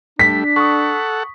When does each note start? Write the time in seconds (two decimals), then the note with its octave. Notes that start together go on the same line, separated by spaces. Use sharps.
0.19 G3 A3 D4 B6
0.56 A4 F#5 C#6 D#6